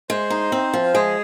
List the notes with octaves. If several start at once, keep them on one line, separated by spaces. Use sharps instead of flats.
G#3 C5
D#4
C4
F3
F4
G#3 G#4